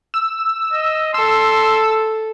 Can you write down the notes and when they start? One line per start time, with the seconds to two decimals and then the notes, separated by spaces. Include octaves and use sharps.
0.14 E6
0.73 D#5
1.14 A4 C6 E6